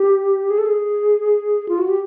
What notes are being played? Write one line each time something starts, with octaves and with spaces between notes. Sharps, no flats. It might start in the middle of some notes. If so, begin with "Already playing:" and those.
Already playing: G4
G#4
A4
G#4
F4
F#4
G4